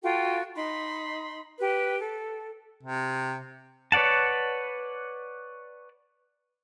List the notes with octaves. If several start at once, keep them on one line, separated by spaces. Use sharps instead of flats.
F4 F#4 A4 G5
D#4 B5 C6
G4 B4
A4
C3
B4 C#5 D5 F#5 A5